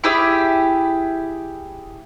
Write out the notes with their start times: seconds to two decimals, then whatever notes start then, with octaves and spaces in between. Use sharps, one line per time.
0.04 E4 G4 G#4 E5